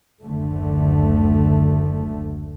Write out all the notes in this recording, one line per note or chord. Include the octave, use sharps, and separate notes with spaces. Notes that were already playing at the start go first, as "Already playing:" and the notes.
F#1 D2 D3 A3